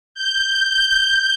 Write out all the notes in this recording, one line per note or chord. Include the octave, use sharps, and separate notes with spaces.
G6